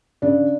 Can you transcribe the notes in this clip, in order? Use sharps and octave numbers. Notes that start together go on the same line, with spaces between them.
C#3 D4